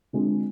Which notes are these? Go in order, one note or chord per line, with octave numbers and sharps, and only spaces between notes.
D3 G#3 C4 F4 G#4